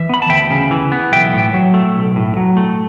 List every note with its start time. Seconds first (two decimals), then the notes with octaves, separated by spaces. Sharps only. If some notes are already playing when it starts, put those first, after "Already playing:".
Already playing: E3 E5
0.09 B3 B5
0.22 A5
0.29 D2 E5 G5
0.50 C#3
0.71 E3
0.92 B3
1.12 B1 E5 G5
1.33 A2
1.54 F#3
1.74 A3
1.96 B1
2.16 A2
2.37 F#3
2.57 A3